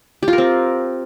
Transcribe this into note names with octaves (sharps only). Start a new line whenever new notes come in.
G4
F4
A#4
C4